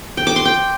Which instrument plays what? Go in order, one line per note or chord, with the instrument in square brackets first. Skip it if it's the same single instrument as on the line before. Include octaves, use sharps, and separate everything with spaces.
[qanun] G5
D6
C6
G5